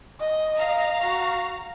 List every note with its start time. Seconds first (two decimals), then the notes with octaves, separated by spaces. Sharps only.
0.20 D#5
0.57 F5 A#5 F6
1.01 F#4